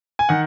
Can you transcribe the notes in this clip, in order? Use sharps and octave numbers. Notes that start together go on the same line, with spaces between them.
G#5
D#3 F#5